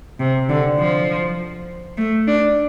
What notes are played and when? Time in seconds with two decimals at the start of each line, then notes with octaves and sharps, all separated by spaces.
0.20 C3
0.49 D3
0.79 F3
1.98 A3
2.28 D4